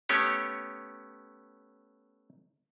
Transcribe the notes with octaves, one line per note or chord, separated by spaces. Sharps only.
A3 B3 C#4 G4 C#5